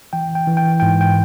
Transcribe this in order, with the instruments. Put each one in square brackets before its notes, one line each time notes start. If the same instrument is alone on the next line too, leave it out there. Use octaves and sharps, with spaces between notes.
[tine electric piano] E3 G5
G5
E3
G5
G#2 G5
G5